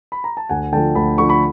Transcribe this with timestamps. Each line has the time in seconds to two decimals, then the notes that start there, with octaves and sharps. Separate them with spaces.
0.12 B5
0.24 A#5
0.37 A5
0.49 D2 F#5 G#5
0.72 D3 F3 A3 G5 A5
0.95 D2 A5 B5
1.18 D3 F3 A3 B5 C#6
1.29 B5 C#6